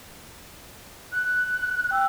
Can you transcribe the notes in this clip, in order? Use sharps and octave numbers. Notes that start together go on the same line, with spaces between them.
F#6
G5 E6